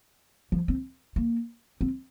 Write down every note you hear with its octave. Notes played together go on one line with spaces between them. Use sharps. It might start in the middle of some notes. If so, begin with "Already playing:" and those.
F3
C4
A#3
C4